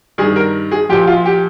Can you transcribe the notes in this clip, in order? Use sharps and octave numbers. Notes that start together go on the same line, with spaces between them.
G2 D#3 G3 G#4
A#4
G#4
A#2 F3 G4
F4
G4